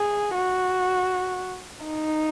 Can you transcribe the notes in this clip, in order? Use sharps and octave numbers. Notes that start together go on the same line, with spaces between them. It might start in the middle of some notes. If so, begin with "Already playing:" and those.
Already playing: G#4
F#4
D#4